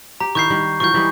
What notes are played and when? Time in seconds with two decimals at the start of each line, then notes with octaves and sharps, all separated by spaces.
0.20 G4 A#5
0.35 D#3 E4 C#6 G6 C7
0.50 D#3 G3
0.80 E3 F#3 F4 C#6 G6
0.94 E3 G3 G#3